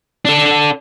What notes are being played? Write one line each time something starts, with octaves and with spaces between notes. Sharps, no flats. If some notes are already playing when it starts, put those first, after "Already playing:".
D4 A4